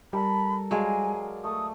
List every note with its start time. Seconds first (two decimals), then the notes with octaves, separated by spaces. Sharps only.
0.13 G3 A4 A#4 A5 B5
0.71 F#3 G#3 G#4 D5 F5 G#5 A#5
1.44 A3 D#6